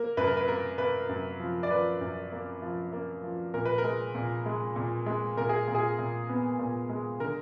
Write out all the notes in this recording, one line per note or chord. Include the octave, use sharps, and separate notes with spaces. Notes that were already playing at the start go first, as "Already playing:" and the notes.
Already playing: A#3 A#4
F#2 B4
A#4
B4
A#3 A#4
A#3 B4
F#2
F3
D5
F3 B4
F#2
A#3
F3
A#3
F3
A#2 A#4
B4
A#4
G#3
A#2
G#3
A#2
G#3
A#2 A#4
G#4
A#2
G#4
A#2
B3
A#2
G#3
D3 A#4